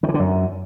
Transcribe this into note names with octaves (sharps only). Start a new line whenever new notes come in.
D#3
E3
D3
F#2